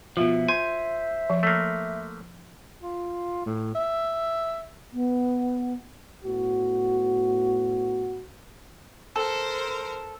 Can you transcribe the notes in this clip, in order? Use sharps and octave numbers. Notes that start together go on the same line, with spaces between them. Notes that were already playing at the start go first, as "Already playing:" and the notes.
B2 F3 F4 E5
C5 G#5
F3
A3 A#3
F4
A2
E5
B3
A2 B3 F#4
A4 A#4 C5